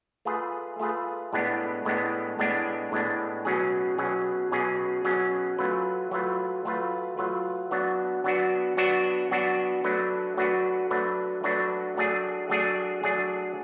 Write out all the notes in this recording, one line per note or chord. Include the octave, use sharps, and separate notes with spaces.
A3 F4 G#4 B4
A3 F4 G#4 B4
A2 G#3 B3 D4
A2 G#3 B3 D4
A2 G#3 B3 D4
A2 G#3 B3 D4
B2 F#3 C#4 G#4
B2 F#3 C#4 G#4
B2 F#3 C#4 G#4
B2 F#3 C#4 G#4
F#3 A3 F4 B4
F#3 A3 F4 B4
F#3 A3 F4 B4
F#3 A3 F4 B4
F#3 B3 D4 F#4
F#3 B3 D4 F#4
F#3 B3 D4 F#4
F#3 B3 D4 F#4
F#3 A3 D4 F#4 B4
F#3 A3 D4 F#4 B4
F#3 A3 D4 F#4 B4
F#3 A3 D4 F#4 B4
F#3 A3 D4 G#4
F#3 A3 D4 G#4
F#3 A3 D4 G#4